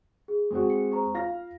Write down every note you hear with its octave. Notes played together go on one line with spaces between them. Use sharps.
G#4
G#3 C4 F#4
C#7
C5 A#5 C#6
F4 F5 A#6